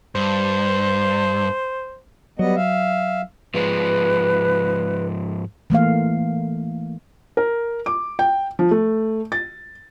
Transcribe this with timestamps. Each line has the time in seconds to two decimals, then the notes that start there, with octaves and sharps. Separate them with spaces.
0.15 G2 C5
2.39 F#3 G3 B3 D#5
2.56 E5 F5
3.54 G#2 F3 G#3 B4
5.70 E3 A3 A#3 F5
7.37 A#4
7.86 D6
8.19 G5
8.59 F3
8.71 A3
9.32 A6